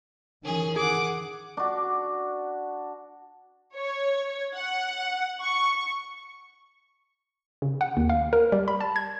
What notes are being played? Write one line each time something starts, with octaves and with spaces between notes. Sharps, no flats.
D#3 E3 C#4 G#4
G#4 F#5 D6
D4 F#4
C#5
F#5
C#6
C#3
F#5
D#2
F5
A#4
G3
B5
A5
G#6